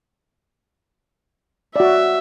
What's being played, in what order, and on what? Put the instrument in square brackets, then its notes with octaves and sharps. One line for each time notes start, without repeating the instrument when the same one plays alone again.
[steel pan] F#4 D5 [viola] E5